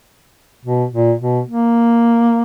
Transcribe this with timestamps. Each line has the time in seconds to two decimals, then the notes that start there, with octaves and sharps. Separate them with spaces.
0.65 B2
0.93 A#2
1.21 B2
1.48 A#3